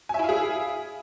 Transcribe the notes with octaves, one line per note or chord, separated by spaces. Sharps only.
E4 G#4 E5 F5 G#5